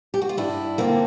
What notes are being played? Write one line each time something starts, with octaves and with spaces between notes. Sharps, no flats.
G4
F#4
F4
G2 D4 E4
D3 F3 A#3 C4